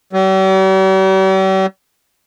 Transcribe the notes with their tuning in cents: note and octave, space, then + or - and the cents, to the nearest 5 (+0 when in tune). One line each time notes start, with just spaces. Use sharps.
G3 -45